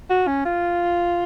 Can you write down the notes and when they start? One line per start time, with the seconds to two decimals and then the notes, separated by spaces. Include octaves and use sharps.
0.10 F#4
0.27 C#4
0.45 F4